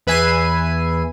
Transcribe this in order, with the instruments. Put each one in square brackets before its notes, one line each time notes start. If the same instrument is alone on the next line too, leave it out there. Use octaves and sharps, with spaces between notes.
[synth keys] E2 B4 E5 G#5 C7 D#7